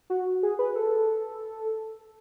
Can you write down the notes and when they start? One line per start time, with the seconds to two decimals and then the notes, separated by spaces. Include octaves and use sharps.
0.10 F#4
0.43 G#4
0.59 B4
0.76 A4